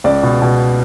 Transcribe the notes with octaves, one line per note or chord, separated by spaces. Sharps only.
C#2 D5
B2
B2